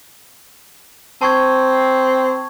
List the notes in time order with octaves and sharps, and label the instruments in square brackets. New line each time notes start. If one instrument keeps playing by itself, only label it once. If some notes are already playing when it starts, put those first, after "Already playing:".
[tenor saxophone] C4 [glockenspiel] A5 C#6 G#6